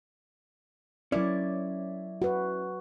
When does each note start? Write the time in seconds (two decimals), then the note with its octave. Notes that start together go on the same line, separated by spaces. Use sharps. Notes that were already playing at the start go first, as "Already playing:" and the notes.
1.12 F#3 C#4 E4 A#4 D5
2.22 F#4 B4